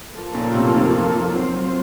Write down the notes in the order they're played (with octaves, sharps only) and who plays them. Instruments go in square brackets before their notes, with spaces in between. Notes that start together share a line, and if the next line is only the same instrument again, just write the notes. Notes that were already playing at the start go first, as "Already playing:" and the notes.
[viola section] F3 A#3 F4 A4
[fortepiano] A#2 C#3
A2 C3
C3 D#3
[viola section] F#3 C4 F4 C5